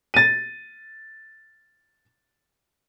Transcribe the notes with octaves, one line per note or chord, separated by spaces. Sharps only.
A6 D#7